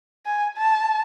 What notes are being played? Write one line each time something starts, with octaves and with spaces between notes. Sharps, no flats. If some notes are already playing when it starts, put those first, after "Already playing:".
G#5
A5